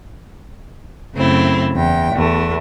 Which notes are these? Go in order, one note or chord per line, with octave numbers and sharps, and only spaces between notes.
F#2 C#3 A3 C4 E4
E2 G5
E2 A3